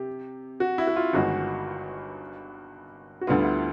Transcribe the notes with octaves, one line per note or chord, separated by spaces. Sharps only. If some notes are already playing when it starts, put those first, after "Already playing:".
Already playing: C3 G4
F#4
E4
F#4
F4
G1 G2 D#3 G#3 F#4
F#4
D2 D3 G3 B3 F4
E4
F4